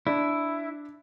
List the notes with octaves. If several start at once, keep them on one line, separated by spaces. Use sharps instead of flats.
D4 E4